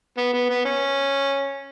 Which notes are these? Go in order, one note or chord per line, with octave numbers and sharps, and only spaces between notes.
B3
B3
B3
C#4